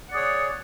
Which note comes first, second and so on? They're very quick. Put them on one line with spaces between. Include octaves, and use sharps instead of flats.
F#5 D5 G#4 C#5